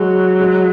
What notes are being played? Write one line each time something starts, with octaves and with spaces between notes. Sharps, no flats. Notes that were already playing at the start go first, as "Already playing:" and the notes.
Already playing: F#3 G#3
G#3